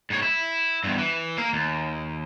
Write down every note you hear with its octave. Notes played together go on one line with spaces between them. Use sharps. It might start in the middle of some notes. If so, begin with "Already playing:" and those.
G#2 C#5
E4
E2 G2
E3
A#3 F5
D#2